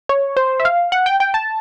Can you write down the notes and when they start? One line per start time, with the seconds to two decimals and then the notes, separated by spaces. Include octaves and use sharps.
0.09 C#5
0.37 C5
0.60 E5
0.65 F5
0.92 F#5
1.06 G5
1.20 G5
1.34 A5